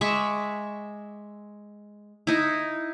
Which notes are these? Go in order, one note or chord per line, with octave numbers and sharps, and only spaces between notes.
G#3 E5 C#6 D6
D#4 E4